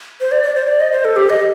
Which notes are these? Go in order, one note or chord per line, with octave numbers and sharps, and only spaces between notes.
C5
D5
D5
C5
D5
D#5
C5
A4
G4
D#5